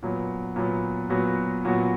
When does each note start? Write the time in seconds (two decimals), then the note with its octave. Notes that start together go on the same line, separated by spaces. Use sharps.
0.03 A#2 F#3 B3
0.56 A#2 F#3 B3
1.10 A#2 F#3 B3 F#4
1.65 A#2 F#3 B3 F#4